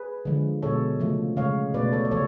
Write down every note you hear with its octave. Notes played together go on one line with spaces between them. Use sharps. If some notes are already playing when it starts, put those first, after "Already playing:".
Already playing: G#4 B4
D3 F3 G#3
B2 G#3 A4 C#5
C#3 F3 A3
C#3 G#3 C#5 F5
B2 A3 B4 D5
A4 C#5
D5
C#3 F3 A4 C#5